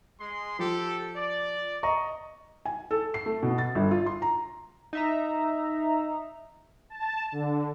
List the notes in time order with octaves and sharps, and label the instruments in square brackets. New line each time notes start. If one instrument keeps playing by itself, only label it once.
[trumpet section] G#3 C6
[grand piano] F3 [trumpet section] G4 A4
[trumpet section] D5
[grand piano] D#5 A#5 C#6
[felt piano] G#5
A4
C7
A3
B2
A6
G1
F4
C6
A#5
[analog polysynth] D#4 E5 A#5
[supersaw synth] A5
D3